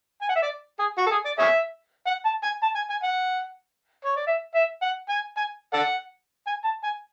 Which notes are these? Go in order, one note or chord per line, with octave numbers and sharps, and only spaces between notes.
G#5
F#5
E5
D5
G#4
F#4
A4
G#4
D5
G#4 C#5 E5
F#5
A5
G#5
A5
G#5
G#5
F#5
C#5
D5
E5
E5
F#5
G#5
G#5
A4 D5 F#5
G#5
A5
G#5